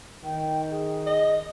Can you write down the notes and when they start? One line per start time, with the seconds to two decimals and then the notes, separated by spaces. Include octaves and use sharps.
0.24 D#3 G5
0.70 G#4
1.07 D#5